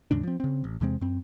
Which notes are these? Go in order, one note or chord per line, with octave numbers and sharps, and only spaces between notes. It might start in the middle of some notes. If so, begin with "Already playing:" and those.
D#2 G#2 C#3 D4
F3 C4
C#3 C4
A1
E2 C3 G#3 C4
F#2 C4